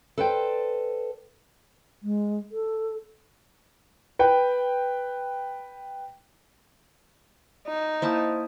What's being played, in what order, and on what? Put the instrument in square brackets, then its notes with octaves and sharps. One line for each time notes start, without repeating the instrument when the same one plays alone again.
[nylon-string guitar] A4 B4 C5 D5 G5
[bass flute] G#3
A4
[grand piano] B4 G5
[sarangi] D#4
[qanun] A#3 E4 A5 [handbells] C5 D#6